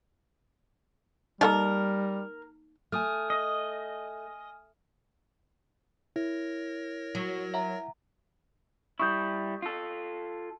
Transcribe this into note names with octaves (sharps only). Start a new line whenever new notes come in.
G3 A#3 D#4 A4 A#4 D#5
A3 G#5 D#6 F6
D#5
E4 A#4 C#5 A#6
F#3
E5 F#5 A#5
G3 E4 C#6 D#6 G6
F4 A4